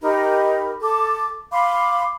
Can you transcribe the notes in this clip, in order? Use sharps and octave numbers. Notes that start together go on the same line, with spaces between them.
D#4 G4 A#4 B5
A4 D6
F5 B5 C6 D6